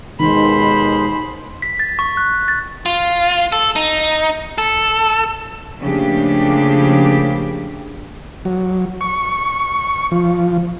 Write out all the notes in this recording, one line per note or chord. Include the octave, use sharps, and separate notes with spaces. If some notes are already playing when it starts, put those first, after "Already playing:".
D#2 B2 D#3 G#3 C5 B5
B6
A6
C#6
F#6
A6
F4
A4
D#4
A4
C#3 F3 A3 A#3 D4 G4
F#3
C#6
F3